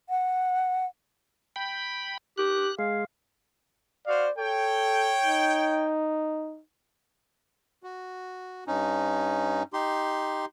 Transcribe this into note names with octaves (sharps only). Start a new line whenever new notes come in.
F#5
G5 B5
G4 F#6
G#3 F5
F#4 C5 D5 F5
A4 C#5 G5
D#4
F#4
G2 C#4 D#4
D#4 G4 C6